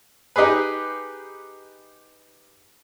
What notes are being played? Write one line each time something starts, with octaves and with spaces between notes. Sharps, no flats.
D#4 G4 G#4 B4